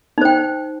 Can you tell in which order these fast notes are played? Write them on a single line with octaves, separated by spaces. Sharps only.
D#4 C5 G5